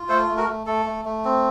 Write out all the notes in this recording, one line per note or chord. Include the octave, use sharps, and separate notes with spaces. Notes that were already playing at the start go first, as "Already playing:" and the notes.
Already playing: F4
A3 A4 C5
A3
F#4 A#4
A3
A3 A4
A3
A3
C4